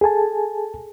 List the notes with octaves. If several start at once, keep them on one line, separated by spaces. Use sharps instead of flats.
G#4 A4 G#5 A5